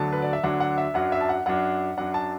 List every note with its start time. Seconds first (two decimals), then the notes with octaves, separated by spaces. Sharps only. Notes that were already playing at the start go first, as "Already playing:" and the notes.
Already playing: D2 D3 F#3 D4 A5
0.12 B4
0.22 D5
0.33 E5
0.44 D2 D3 F#3 D4 F#5
0.60 F#5
0.78 E5
0.94 F#2 F#3 D4 F#5
1.12 E5
1.21 A5
1.29 F#5
1.46 F#2 F#3 D4 F#5
1.97 F#2 F#3 D4 F#5
2.14 A5